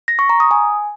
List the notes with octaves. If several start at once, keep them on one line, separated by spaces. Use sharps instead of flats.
A#6
C#6
A#5
D#6
G#5